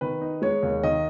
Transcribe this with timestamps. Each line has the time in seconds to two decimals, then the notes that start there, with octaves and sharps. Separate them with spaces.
0.01 D#3 B4
0.21 D#4
0.42 G#3 C#5
0.63 D#2
0.83 D#3 D#5